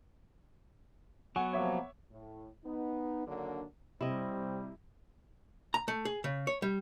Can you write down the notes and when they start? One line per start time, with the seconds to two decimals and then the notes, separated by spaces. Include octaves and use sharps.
1.36 F#3 B3 F#5 G#5 C#6
1.53 C3 F3 A#3 C#5 E5 D6
2.11 A2
2.65 B3 D#4
3.26 D3 D#3 F#3 A#3 D4
4.01 C3 G3 C4 E4 D#5
5.74 A#5
5.88 A3
6.05 G#4
6.24 C#3
6.47 C#5
6.62 G3